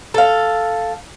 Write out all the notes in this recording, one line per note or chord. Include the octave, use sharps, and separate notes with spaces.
A4 F5